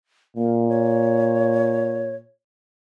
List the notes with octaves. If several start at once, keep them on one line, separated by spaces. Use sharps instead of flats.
A#2 A#3
C#5